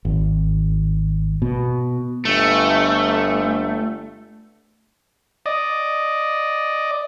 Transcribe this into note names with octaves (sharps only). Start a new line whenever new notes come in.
G#1
B2
G1 A3
D5 D#5